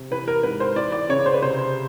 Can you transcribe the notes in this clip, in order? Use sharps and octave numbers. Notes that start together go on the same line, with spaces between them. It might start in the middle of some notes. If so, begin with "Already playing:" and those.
Already playing: C3
E3 B4
A#4
G#2 B4
C5
E3 D5
D5
C#3 C#5
C5
B4
C3 C5